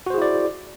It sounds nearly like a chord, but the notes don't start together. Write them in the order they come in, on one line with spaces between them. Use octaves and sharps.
F#4 C5 G#4 E4 D5